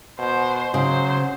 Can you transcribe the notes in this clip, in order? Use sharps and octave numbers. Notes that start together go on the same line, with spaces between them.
B2 C5
C#3 F#3 C5